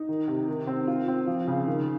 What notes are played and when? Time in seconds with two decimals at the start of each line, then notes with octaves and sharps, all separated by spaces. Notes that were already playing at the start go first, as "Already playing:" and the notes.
Already playing: D#4
0.09 D#3
0.28 C3
0.48 D#3
0.67 C4
0.87 F4
1.08 C4
1.27 F3
1.47 C#3
1.67 D#3